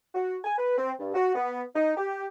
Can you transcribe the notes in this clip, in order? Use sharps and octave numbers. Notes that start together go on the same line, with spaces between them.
F#4
G#5
B4
C4
G2
F#4
B3
D#4
G4